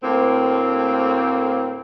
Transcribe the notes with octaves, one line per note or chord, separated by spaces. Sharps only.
D2 A2 A#3 C4